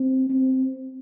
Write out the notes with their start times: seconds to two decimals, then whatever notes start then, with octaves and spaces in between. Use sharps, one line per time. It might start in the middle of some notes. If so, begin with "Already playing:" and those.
Already playing: C4
0.29 C4